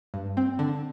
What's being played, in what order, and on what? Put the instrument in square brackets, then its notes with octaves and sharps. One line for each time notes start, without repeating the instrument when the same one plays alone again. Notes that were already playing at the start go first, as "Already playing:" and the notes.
[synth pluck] G2
C4
D3